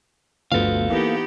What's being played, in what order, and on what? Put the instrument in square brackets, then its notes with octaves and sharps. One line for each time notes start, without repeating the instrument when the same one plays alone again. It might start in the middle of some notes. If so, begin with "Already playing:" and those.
[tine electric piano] G1 D2 [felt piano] F3 B3 [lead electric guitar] A4 F5
[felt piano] E3 [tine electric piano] A#3 [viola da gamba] B3 D#4 G4